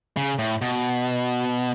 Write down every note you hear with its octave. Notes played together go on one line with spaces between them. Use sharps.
C#3
A2
B2